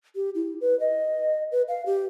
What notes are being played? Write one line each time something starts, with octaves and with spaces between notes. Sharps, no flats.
G4
E4
B4
D#5
B4
F5
G4